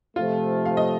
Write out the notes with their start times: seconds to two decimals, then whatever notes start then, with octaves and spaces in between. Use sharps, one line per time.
0.16 C3 F3 A3 F4
0.66 F5
0.77 D#5